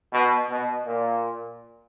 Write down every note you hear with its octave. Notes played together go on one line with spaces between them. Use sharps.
B2
B2
A#2